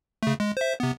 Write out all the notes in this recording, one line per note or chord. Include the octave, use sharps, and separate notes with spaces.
C#3 A3
G#3
C5 E5
C3 B3